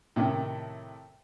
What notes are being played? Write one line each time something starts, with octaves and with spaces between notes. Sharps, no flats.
A2 C3 D#3